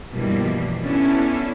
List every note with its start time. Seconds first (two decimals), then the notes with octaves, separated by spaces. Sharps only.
0.13 G2 B2 E3 F3 G3 A#3
0.81 B3 C#4 D4 E4 A4